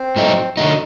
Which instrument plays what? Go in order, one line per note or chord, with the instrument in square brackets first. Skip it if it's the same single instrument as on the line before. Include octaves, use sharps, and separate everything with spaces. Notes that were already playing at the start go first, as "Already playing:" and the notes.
Already playing: [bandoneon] C4 C5
[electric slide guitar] A2 F#3 A3 D#4
[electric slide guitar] D3 A3 D#4 [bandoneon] F#3 F#4